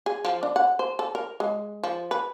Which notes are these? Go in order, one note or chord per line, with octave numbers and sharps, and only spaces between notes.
G#4
F3
D4
F#5
C5
A4
A#4
G#3
F3
B4